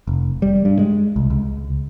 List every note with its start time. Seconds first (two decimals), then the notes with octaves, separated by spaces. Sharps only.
0.07 F1
0.42 G3
0.65 G2
0.79 G#3
1.16 C2
1.30 C#2